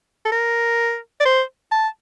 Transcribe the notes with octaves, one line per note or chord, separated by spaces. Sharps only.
A4
A#4
D5
C5
A5